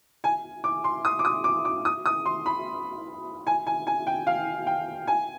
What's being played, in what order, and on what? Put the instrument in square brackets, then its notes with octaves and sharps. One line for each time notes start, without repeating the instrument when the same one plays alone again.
[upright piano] G#5
D6
C6
D#6
D6
D#6
D6
D6
D#6
D#6
C6
B5
G#5
G#5
G#5
G5
F5
G5
G#5